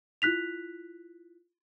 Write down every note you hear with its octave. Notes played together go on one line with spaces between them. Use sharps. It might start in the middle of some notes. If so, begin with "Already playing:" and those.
E4 F4 F#6 B6 F7